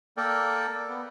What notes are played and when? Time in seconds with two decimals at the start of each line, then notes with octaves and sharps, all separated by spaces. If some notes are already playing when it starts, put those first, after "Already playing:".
0.17 A#3 A4 A#4 D5 G5
0.89 B3